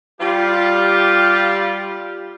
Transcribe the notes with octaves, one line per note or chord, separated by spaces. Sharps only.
G3 F4 G4